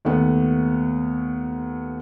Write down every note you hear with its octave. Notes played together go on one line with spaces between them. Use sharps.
D#2 A3 B3